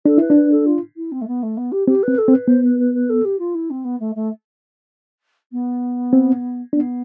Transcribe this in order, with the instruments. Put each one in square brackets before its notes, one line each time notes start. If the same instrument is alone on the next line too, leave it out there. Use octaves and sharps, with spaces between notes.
[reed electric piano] D4 [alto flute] A4
[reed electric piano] E4 [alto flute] B4
[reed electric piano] D4
[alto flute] B4
A4
F4
E4
C4
A3
B3
A3
B3
G4
[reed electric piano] C4 [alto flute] G4
[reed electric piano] C4 [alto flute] B4
[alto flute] A4
[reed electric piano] C4
[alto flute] B4
[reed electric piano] B3 [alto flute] C5
[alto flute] B4
B4
B4
A4
G4
F4
E4
C4
B3
A3
A3
B3
[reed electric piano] C4
[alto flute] B3 [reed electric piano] D4